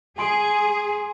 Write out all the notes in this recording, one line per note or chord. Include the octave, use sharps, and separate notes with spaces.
G#4 G#5 C6 D7